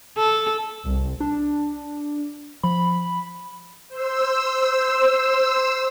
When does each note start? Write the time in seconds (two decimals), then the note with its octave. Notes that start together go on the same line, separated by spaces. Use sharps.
0.17 A4
0.85 C2
1.20 D4
2.63 F3 B5
3.89 C5 E6